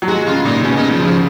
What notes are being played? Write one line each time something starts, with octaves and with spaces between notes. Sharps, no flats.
F#3
G#3 F#4
C#3 F4
A#2 D#4
B2 C#4
C#3 D#4
F3
C#3 F3